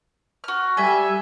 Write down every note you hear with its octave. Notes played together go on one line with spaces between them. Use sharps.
F#4 F6
G3 A4 E5 G#5